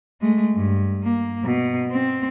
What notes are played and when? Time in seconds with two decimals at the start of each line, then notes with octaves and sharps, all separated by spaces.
0.21 G#3 A3
0.54 G2
1.03 A#3
1.44 B2
1.91 C4